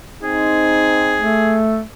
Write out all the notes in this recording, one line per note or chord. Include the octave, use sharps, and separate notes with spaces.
C4 D#4 G#4
A3